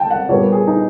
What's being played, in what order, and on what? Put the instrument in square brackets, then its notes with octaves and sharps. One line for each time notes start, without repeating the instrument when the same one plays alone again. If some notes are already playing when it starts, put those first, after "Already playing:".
Already playing: [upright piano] G5 A5
F#5
A#2 G3 B3 C#5
G#4
D#4